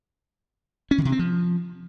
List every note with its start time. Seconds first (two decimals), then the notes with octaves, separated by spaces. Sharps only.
0.91 C#4
0.98 D#3
1.05 C3
1.12 C4
1.19 F3